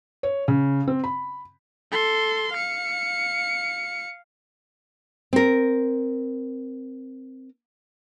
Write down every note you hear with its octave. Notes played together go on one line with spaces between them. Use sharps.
C#5
C#3
C4
B5
A4 C6
F5 C#7
C4 A#4